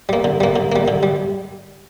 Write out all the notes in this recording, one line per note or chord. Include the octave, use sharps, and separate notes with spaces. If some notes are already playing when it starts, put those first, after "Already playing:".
G3 A#3
D3
G3 A#3
D3
G3 A#3
D3
G3